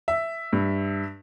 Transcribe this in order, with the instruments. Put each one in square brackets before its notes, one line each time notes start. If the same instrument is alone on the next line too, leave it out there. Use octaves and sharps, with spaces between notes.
[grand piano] E5
[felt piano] G2